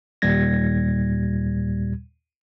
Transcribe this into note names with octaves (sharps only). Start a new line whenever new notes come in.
D#2 A#2 G3 G#6 A#6